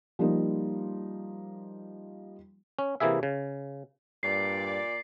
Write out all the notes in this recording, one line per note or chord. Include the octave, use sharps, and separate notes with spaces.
F3 G3 A#3 D#4
C#4
C3 E3 A#3 E4 G#4 E5
C#3
G2 A#2 D5 C7